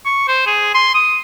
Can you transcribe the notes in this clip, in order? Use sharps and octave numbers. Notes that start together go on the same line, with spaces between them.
C#6
C5
G#4
C6
D#6